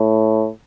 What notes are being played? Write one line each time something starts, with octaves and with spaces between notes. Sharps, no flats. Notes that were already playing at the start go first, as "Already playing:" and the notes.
Already playing: A2